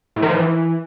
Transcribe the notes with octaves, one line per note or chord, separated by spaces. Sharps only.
A2
D#3
F3
E3